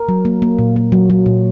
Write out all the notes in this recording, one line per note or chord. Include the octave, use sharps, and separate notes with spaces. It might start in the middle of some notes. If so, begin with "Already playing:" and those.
Already playing: A#4
F#3
A#3
A#3
A#2
A#3
F#3
F#3
A#2